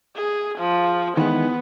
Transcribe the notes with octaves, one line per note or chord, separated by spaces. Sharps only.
G#4
F3
D#3 E3 G#3 B3